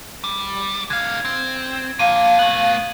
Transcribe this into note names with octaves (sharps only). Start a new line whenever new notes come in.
G3
D3 F5 G#6
C4
F3 A#3 F5 D#7
A3 B3 F#7